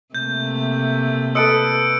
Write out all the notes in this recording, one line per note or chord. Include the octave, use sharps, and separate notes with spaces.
C3 A3 A#3 G6
A4 B4 D#5 E6 C#7 D7